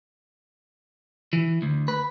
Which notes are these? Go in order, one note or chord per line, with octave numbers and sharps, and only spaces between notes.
E3
D2
B4